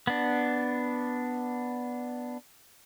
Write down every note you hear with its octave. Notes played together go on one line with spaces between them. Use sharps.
B3 D4